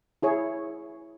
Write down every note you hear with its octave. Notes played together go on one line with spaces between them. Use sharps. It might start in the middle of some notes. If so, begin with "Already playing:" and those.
E4 G#4 C#5